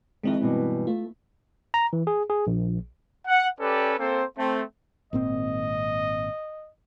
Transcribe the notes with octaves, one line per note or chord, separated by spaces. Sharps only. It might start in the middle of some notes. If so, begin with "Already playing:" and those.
F2 D#3 G#3 C4 E4
G2 B2 E3
A3 F4
A#5
E3
G#4
G#4
A#1
F#5
C#4 G4 A4 B4 D5
A#3 C4 A4 C5
A3 C4
G#1 A#2 C4 D#5